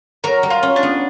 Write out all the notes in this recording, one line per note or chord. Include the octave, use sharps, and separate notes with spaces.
F#3 A#4
G3
F4
C#4
D4
B3